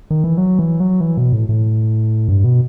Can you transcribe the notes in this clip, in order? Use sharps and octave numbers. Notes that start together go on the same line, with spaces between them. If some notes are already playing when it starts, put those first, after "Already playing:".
D#3
E3
F#3
E3
F#3
E3
B2
A2
A2
G2
B2